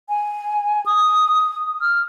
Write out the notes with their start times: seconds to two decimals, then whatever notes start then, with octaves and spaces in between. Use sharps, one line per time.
0.09 G#5
0.86 D#6
1.81 F6